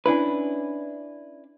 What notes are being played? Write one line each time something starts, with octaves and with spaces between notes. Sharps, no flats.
C#4 D4 E4 B4